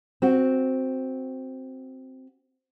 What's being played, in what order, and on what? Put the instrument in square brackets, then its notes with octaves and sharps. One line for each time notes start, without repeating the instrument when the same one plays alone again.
[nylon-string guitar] C4 F#4